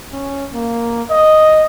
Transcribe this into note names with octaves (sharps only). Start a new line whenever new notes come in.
C#4
A#3
D#5